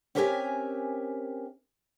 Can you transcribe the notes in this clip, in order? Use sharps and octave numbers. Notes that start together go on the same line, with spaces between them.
C4 C#4 G4 A#4 E5 G#5